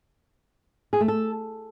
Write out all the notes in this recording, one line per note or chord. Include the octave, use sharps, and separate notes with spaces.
G#4
A3
A4